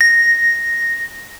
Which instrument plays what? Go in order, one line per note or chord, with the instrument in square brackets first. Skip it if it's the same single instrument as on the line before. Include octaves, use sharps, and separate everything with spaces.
[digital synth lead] A#6